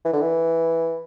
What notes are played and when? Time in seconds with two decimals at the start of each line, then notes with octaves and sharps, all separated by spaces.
0.05 E3
0.13 D3
0.21 E3